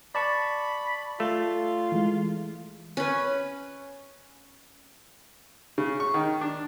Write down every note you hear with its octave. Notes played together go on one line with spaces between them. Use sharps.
D5 A5 B5 C#6
A3 F4
E3 G#3
C#4 B4
C#3
C#6
D#3
D4